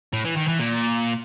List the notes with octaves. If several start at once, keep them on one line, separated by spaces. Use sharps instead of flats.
A2
E3
D#3
E3
A#2